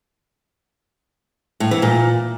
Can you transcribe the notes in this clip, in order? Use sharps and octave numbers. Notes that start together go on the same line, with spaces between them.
A2
E3
A#2